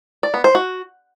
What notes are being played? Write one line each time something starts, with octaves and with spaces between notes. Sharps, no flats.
D5
B3
C5
F#4